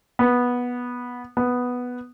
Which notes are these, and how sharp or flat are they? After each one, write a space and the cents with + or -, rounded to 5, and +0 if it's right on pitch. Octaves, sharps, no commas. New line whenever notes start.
B3 -10
B3 +0